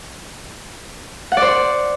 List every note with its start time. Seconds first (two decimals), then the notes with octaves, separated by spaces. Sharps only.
1.32 F#5
1.37 D5
1.42 C5